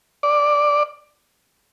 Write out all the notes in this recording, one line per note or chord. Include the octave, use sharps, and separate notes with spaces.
D5